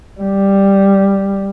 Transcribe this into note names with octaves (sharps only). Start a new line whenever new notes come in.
G3